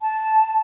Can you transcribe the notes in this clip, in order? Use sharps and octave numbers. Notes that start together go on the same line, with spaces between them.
A5